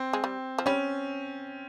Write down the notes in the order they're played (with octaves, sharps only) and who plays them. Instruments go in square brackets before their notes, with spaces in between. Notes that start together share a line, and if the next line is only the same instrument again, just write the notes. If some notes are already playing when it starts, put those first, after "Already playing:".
Already playing: [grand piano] C4
[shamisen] G#3
G3
F3
[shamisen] G3 [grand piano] C#4